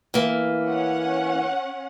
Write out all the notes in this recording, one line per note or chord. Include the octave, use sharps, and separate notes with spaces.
E3 A#3
C#4 F#5